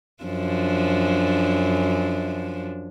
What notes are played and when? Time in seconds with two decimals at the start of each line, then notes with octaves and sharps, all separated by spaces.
0.23 F#2 F3 D4